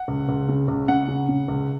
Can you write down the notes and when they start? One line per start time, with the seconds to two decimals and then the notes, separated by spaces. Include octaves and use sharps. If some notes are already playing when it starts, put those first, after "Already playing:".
Already playing: F#5
0.08 C#2
0.29 C#2
0.49 C#3
0.68 C#2
0.88 C#3 F#5
1.08 C#3
1.29 C#3
1.48 C#2